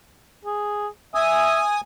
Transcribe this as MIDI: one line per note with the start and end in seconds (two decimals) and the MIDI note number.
0.45 0.87 68
1.15 1.62 76
1.15 1.81 80
1.15 1.81 87